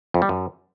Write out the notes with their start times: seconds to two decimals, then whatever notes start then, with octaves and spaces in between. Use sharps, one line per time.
0.14 F2
0.22 G3
0.29 F#2